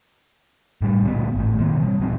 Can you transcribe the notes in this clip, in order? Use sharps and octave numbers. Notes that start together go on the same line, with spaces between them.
A2 G3
D2 A#2 A#3 B3
G#1 A2
B2 D#3 A#3 C4
E3 G3
D#1 A#2 E3 C4